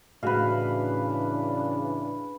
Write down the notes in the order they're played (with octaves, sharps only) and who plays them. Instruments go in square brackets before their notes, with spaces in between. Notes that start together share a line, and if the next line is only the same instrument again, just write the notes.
[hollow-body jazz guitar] A2 F#4 G#4 [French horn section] C#3 E3 D4 [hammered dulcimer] B4 F5